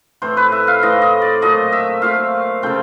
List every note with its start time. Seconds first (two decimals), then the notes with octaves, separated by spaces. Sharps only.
0.22 A2 E3 A3 C4 C5
0.37 B4
0.52 E5
0.67 F5
0.82 A2 E3 A3 C4 D#5
1.02 D#5
1.22 D5
1.42 A#2 F#3 A3 C4 D#5
1.72 E5
2.02 A#2 F#3 A3 C4 F5
2.62 C#3 F3 A3 C4 G5